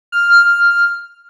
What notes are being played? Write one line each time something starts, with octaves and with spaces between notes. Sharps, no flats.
F6